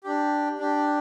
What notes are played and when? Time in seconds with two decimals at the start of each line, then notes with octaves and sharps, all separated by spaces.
0.04 D4 G4
0.59 D4 G4